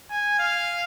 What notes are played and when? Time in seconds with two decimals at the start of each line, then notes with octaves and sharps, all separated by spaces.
0.10 G#5
0.39 F5